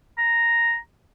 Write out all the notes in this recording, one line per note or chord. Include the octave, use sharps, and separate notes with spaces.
A#5